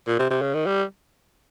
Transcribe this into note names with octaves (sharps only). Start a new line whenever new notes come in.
A#2
C3
C3
C#3
D#3
G3